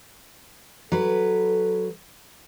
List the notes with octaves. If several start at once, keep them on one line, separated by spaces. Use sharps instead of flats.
F#3 A4 B4